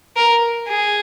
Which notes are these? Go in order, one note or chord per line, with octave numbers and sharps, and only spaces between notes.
A#4
G#4